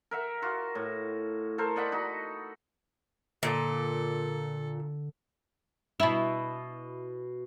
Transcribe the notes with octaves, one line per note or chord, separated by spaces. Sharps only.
A#4 E5 F#5
F4 F#4
A2
A4 A#4 C5
D5 D#5 F#5 B5
D#4 F#4
A#2 D3 A4
B2 E4